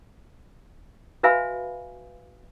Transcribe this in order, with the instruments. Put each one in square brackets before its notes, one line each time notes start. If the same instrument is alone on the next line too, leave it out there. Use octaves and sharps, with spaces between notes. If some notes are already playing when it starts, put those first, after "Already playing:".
[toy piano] F#4 B4 E5 F5 G#5 B5